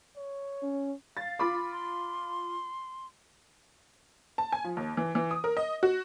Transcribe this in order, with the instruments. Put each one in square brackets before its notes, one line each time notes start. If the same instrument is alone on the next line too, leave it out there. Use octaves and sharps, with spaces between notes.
[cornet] C#5
[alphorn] C#4
[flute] F5 [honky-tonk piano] A6
[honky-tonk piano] F4 B5 D6
[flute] C6
[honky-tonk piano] A5
G#5
F3
D#2
E3
E3
D#6
A#4
D#5
F#4